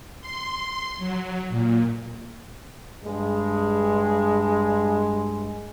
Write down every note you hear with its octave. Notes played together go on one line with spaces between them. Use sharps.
C6
F#3
A#2
G2 G#3